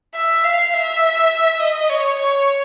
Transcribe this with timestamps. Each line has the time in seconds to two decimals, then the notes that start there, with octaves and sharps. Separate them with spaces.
0.15 E5
0.44 F5
0.74 E5
1.60 D#5
1.90 C#5
2.19 C#5